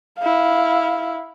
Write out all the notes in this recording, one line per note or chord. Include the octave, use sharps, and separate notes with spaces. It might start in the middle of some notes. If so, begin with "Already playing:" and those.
E4 F5